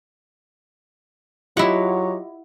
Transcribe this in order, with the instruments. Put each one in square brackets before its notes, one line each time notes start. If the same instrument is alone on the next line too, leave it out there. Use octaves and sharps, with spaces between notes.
[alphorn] F#3 [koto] E4 F#5 [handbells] F4 G4 D#5